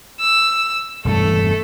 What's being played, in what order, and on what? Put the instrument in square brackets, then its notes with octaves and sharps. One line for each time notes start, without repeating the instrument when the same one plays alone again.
[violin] E6
[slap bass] E1 G2 E3 [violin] A3 A4